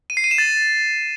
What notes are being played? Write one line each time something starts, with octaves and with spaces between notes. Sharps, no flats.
D#7
C7
D#7
E7
A6